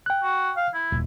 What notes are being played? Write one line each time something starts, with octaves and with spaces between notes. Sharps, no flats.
G5 F#6
F#4
F5
E4
D#1